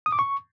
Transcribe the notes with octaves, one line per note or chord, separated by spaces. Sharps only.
D#6
D6
C#6